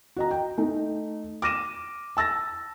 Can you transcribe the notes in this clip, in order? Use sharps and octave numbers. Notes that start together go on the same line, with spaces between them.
F#4 D#5 A#5
G5
A3 D#4
D6 F6 A#6 D#7 E7
A5 E6 A6 A#6